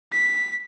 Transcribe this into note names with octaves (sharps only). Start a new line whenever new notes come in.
B6